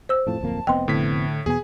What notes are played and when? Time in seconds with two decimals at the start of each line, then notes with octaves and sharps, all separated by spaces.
0.09 C5 E6
0.27 F2 A2 F3 A5
0.41 D1 F2 A#3
0.67 F1 B3 C4 D#5 G5 C6
0.88 A2 D3 B6
1.46 E2 B2 B3 G#4 G#5